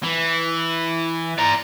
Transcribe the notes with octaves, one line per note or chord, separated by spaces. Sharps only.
E3
D5 A#5